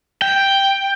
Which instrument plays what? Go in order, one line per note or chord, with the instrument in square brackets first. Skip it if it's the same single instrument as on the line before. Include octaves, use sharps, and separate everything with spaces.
[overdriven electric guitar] G5